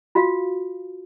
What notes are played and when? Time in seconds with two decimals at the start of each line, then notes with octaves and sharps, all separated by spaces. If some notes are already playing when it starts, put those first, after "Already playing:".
0.15 F4 F#4 F5